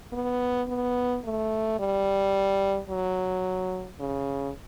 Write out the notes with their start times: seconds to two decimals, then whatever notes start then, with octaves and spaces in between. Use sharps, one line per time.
0.13 B3
0.68 B3
1.24 A3
1.79 G3
2.89 F#3
4.00 C#3